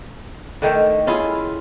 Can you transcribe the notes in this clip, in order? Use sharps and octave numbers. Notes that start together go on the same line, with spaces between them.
D3 D#3 A3
C#4 E4 F4 G#4